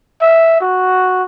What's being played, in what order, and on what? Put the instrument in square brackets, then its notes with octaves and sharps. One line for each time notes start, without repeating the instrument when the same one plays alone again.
[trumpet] E5
F#4